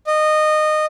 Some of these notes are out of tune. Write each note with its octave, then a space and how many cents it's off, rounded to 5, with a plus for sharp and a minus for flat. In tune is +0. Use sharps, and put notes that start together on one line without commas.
D#5 -20